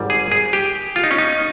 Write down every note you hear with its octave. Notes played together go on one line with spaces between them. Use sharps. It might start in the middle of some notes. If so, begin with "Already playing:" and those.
Already playing: G#1 G#2 G3
G#4
G#4
G4
F4
D#4
C#4
D#4